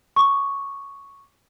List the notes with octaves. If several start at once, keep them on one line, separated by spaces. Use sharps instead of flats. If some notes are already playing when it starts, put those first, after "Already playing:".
C#6 D6